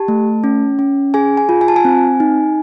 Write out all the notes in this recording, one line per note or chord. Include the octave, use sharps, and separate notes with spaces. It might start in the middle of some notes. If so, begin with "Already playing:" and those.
Already playing: G4 A5
A3
C#4
C#4
G#4 G#5
G#5
F4
G#5
A5
G#5
C4
D#4